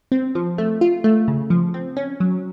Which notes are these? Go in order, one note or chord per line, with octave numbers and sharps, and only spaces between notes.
C4
F3
A3
F4
A3
C#3
F3
C4
C#4
F#3